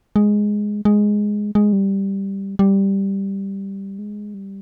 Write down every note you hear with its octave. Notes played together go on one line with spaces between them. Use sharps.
G#3
G#3
G#3
G3
G3
G#3
G3